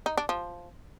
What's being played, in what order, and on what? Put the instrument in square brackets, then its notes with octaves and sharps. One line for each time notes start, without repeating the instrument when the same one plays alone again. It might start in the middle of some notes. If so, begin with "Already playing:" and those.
[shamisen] D#4
D4
F3